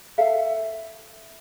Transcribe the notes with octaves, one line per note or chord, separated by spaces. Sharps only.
A4 E5 F5